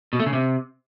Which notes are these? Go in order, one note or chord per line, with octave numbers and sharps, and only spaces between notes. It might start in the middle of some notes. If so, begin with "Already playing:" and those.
B2
A3
C#3
C3